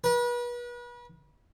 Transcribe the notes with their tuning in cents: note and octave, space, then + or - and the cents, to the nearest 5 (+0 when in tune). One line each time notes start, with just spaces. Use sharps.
B4 -35